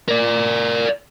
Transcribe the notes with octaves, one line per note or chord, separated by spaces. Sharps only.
A#4 D5